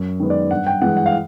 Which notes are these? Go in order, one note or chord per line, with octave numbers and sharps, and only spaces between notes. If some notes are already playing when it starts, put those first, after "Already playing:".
Already playing: F#2
D#3 G#3 B3
D5
G2 F#5
G5
E3 G#3 F#5
F#5
F5